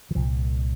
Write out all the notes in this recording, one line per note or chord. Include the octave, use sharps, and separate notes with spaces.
E3
C2 A#2 F3